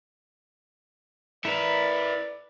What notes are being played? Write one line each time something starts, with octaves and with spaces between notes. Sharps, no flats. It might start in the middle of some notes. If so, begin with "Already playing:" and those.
A3 E4 A#4 B4 D5